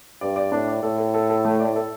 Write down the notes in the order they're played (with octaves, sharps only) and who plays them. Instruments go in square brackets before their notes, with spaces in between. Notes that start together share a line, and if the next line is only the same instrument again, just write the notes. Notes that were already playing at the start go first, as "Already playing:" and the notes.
[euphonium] G2 [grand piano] D5
[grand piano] D5
[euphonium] A2 [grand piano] D4
[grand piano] D5
[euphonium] A2 [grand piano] A4
[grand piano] A4
A4
A4
A3
D5
A4